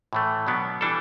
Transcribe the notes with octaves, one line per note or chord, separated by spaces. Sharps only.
A2 E3 A3
B2 F#3 B3 D4
E3 G3 D4 A4